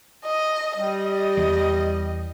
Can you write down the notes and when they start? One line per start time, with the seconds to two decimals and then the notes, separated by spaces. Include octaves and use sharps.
0.25 D#5
0.77 G3 D#5
1.37 E2 E3